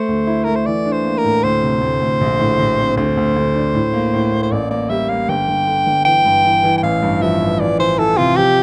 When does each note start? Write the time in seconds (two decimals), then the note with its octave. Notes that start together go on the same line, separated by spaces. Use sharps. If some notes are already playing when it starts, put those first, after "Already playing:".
Already playing: A3 C5
0.09 D2
0.27 E4
0.44 A3 A#4
0.56 C5
0.66 E3 D5
0.85 D4
0.92 C5
1.04 A#3
1.18 A#4
1.24 A2
1.43 D2 C5
1.62 C3
1.81 D2
2.01 D2
2.21 A#1
2.40 A2
2.59 A#1
2.78 C4
2.97 D2 C5
3.17 D2
3.36 D2
3.56 D4
3.74 A2
3.93 A#3
4.14 A2
4.32 A#3
4.43 C5
4.52 A1 D5
4.71 A#3 D5
4.90 G3 E5
5.09 A#3 F5
5.29 G1 G5
5.48 G1
5.67 D3
5.87 G1
6.05 E3 G5
6.25 G2
6.44 E3
6.63 E3
6.78 G5
6.83 A1 F5
7.02 G2
7.21 F3 E5
7.41 A1
7.60 E3 D5
7.79 E3 C5
7.99 E3 A4
8.17 C3 F4
8.37 F3 G4